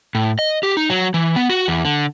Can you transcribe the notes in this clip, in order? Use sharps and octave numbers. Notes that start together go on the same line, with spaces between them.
A2
D#5
G4
D#4
F#3
E3
B3
F#4
E2
D3